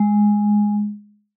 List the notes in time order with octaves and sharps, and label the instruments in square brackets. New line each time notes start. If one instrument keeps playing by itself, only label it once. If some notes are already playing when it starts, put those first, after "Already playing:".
Already playing: [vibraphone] G#3